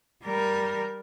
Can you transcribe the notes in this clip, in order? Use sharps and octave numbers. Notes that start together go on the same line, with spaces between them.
G3 A#4